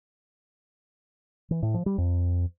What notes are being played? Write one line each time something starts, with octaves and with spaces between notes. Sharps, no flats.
E3
A2
F3
G3
F2